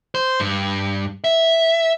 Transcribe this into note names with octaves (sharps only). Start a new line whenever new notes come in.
C5
G2
E5